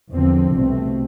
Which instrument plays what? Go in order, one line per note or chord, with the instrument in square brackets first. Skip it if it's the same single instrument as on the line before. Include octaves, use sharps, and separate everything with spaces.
[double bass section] E2 D3 F3 C4
C2 B2 A3 C4